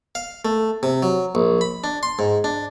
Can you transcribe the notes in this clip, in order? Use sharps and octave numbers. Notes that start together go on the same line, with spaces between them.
F5
A3
C3
F#3
A#1
B5
D4
C6
G#2
D4